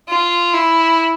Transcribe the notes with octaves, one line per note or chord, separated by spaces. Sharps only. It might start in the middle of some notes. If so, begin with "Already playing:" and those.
F4
E4